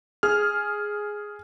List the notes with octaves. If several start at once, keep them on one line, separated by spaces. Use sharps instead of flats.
G#4 F6